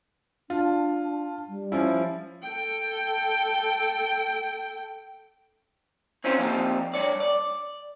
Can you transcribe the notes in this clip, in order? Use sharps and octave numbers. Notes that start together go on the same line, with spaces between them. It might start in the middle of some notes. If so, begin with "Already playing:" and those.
D4 F4
G3
F3 C#4 E4
A4 G5
C4 C#4 D#4 F4 C5
F3 A#3 C4 D#4 F4 G4
G2 C#5 D5
D5